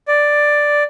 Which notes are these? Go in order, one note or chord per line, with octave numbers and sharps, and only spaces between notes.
D5